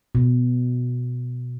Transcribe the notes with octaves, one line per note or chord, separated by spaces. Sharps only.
B2